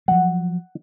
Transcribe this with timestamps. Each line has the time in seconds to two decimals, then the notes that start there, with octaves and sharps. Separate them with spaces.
0.08 F3 F#3 F#5